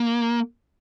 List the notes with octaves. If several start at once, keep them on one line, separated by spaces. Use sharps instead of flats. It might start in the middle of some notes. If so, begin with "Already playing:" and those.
Already playing: A#3